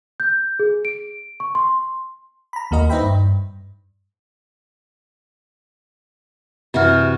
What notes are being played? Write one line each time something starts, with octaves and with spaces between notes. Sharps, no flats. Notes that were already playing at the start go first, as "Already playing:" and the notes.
G6
G#4
D7
C#6
C6
A#5 B5
D#2 A#3 F#4 D#5
D#4 B4 C5 E5 G5 B5
G2
F#2 C3 E3 F#4 F6